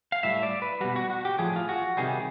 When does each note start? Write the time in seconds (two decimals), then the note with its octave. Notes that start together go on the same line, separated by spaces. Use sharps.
0.12 F5
0.23 A2 E3 G3 E5
0.43 D5
0.62 B4
0.81 B2 G3 F#4
0.96 F#4
1.10 F#4
1.25 G4
1.39 A2 F3 G#4
1.56 F4
1.69 F#4
1.97 C3 D#3 G3 G#4